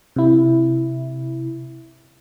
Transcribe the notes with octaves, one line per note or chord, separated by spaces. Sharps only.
C3 E4